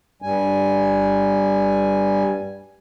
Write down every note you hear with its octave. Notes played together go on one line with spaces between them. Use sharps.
G2 G3 G#5